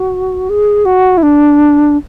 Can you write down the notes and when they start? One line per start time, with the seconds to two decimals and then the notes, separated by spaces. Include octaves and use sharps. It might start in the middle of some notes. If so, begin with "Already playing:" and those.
Already playing: F#4
0.50 G#4
0.85 F#4
1.17 E4
1.23 D4